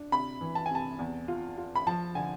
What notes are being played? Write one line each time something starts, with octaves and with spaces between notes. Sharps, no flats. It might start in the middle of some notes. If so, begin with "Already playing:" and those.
Already playing: D4
C3 B5
E3
A5
G#5
C3 A5
E2
F4
F4
B5
F3 A5
D3 G#5